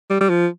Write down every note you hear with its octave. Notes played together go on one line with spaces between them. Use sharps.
G3
G3
F3